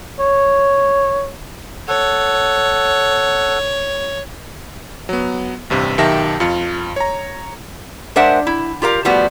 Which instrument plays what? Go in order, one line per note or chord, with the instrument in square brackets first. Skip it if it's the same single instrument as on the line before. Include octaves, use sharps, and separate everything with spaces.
[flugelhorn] C#5
[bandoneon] A4 F#5 [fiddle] C#5
[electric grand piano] F#3 B3
A1 G2 C3
B1 D#3 G4 E5 A5 A#6
F2 F4 C#7
C#5 A#5
[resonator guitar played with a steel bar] G#3 D4 A#4 C5 E5 F#5
E4
F4 G4 A#4 F5
F3 G3 A3 B3 F#4